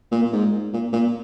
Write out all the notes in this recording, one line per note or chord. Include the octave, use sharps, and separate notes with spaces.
A#2
A#2
G#2
A#2
A#2